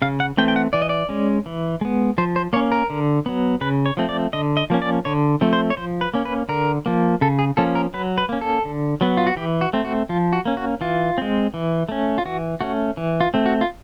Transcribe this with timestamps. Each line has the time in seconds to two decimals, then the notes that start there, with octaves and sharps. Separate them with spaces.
0.02 C#3 F5
0.20 F#5
0.37 E3 A3 C4 G5
0.48 G5
0.56 F#5
0.73 E3 D5
0.82 D#5
0.89 D5
1.09 G#3 C#4
1.46 E3
1.81 G#3 B3
2.18 F3 C5
2.36 C5
2.53 A#3 C#5
2.56 C#4
2.72 A#4
2.90 D3
3.26 F#3 B3
3.61 C#3 B4
3.86 C#5
3.97 F3 A3 C4
4.09 D5
4.33 D3 D#5
4.57 D#5
4.70 F3 A#3 C#4
4.82 D5
5.05 D3 C#5
5.41 F3 A3 C4
5.53 C5
5.70 C#5
5.77 F3 C5
6.01 B4
6.14 A#3 C#4
6.25 B4
6.49 D3 A#4
6.86 F3 A#3
7.21 C#3 A4
7.39 G#4
7.57 F3 A#3 C#4 A4
7.75 A#4
7.94 F#3 B4
8.18 B4
8.29 A#3 C#4
8.41 A4
8.65 D3
9.01 F#3 B3
9.17 F4
9.27 F#4
9.37 E3 G4
9.61 F#4
9.73 A3 C4
9.85 F#4
10.09 F3 F4
10.33 F#4
10.46 A#3 C#4
10.57 F#4
10.81 E3 F4
11.18 G#3 C4
11.54 E3
11.89 A3 C#4
12.18 F4
12.26 E3 F#4
12.61 A3 C#4 F#4
12.97 E3
13.21 F4
13.34 A3 C4
13.46 F#4
13.61 F4